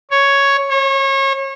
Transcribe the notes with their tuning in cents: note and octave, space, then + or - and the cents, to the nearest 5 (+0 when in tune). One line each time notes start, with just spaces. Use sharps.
C#5 +5
C#5 -30